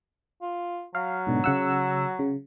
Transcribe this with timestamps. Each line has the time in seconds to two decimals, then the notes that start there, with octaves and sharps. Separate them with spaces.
0.42 F4
0.95 F#3 F5
1.27 G#2 B2 D3
1.44 C#3 F#5 E6
2.19 C#3